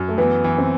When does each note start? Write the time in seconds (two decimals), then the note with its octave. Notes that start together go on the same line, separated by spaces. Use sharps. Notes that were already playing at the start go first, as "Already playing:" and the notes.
Already playing: F#2
0.08 A3
0.18 E3 B3
0.44 E3
0.58 C4